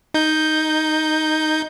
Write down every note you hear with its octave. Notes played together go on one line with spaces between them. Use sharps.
D#4 G6